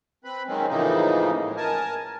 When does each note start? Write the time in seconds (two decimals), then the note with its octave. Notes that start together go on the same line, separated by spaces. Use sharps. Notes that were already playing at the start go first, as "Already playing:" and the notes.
0.24 C4 B4 B5
0.48 D#3 F#3 G#3 C4 C#4
0.69 A2 C#3 E3 F3 A#3 D#4
1.44 A2 G#3
1.57 A#4 G#5 A5